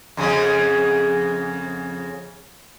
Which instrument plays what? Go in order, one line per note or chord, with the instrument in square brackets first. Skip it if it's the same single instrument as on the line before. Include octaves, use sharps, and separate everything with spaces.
[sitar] F2 C#3 G#4